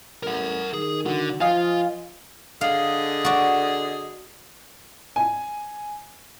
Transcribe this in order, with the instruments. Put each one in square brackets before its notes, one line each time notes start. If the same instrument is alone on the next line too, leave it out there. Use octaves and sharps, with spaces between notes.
[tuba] A1 [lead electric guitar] A#4 F#5
[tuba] D#3 [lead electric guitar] G#4
[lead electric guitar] D3 [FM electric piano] F#4
[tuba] F3 [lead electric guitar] F4 [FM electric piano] D#5 F5 G#5
[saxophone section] D3 G#4 D#5 [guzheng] F5
[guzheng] F#4 D5
[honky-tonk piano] G#5